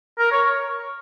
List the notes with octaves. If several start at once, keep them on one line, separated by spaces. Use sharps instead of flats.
A#4
C#5